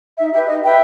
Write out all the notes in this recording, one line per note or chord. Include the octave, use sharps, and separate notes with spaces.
D#4 E5
G4 B4 E5
D#4 D#5
G4 B4 E5 G5